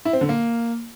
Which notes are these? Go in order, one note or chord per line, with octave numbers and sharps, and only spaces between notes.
E4
C4
D3
A#3